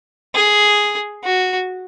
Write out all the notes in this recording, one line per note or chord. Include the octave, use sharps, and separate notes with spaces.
G#4
F#4